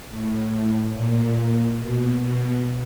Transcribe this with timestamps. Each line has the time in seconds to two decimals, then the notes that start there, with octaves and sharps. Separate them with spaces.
0.11 A2
0.94 A#2
1.80 B2
2.22 B2